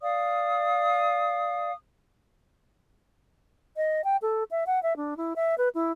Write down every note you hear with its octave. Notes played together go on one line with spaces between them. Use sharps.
D5 F5 D#6
D#5
G5
A4
E5
F#5
E5
D4
E4
E5
B4
E4